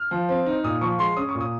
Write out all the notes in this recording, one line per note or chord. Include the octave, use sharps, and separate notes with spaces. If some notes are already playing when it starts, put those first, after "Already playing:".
Already playing: F6
F3
C4
D#4
A#2 D#6
F3 C#6
G#3 C6
C#4 D#6
C#6
A#2
D#6